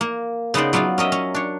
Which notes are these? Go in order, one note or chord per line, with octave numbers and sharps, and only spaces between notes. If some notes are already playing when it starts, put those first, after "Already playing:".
A#3
C#3 B3 D#4 C5 D5
F#3 B3 F4 D5 F5
C#4 A#4 D#5 E5
C#4
D4 C#5